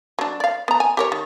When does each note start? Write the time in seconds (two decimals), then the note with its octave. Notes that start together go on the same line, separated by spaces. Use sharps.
0.19 F#3 D4
0.40 D5 F5
0.68 B3 A#5
0.80 G#5
0.97 G4 A#4 C#5
1.12 D#3